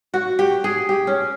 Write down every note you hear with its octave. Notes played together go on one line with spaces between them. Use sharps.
F#4
G4
G#4
G4
C#4